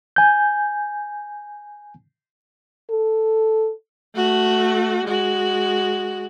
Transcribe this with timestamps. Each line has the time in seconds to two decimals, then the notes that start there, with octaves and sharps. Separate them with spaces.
0.16 G#5 G6
2.90 A4
4.15 A3 F#4
5.05 G#3 F#4